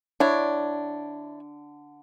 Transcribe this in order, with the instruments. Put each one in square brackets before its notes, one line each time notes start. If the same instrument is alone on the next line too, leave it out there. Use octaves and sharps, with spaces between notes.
[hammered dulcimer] D3 [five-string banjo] D4 E4 C#5